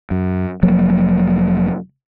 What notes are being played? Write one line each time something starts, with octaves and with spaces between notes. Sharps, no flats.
F#2
F1 F3 F#3 A#3